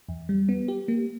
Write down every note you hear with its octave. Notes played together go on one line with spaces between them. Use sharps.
E2
G3
B3
G4
A#3